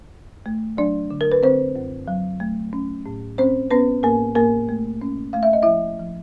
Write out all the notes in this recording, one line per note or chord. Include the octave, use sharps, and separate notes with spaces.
F#2
A3
F#3 D4 D5
D3
A#4
B4
D3 C4 C5
F#2
F#3
A3
C#4
A2
C4 C#4 C5
B3 C#4 B4
A2 A#3 A#4
A2 A#3 A#4
A3
C#4
A3 F5
E5
D#5
F3 E4 E5
F3